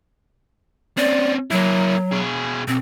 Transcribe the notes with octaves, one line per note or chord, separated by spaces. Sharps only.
C4 C#4 D5
F#3 A#3 E4
B2 G#4
B1 C4